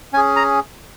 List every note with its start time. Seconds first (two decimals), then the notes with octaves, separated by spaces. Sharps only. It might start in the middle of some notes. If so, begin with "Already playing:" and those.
0.13 C#4 G#5
0.17 G#4
0.36 A#5